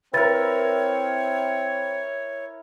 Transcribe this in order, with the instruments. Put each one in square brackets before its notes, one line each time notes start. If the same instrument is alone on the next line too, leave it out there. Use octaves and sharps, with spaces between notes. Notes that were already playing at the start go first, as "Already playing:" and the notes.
[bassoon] C4 [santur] E4 A#4 [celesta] B4 A6 [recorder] C#5